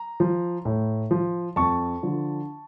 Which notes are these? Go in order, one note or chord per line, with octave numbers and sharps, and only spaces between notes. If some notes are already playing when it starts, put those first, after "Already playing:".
Already playing: A#5
F3
A2
F3
F2 A5 C#6
D3 F3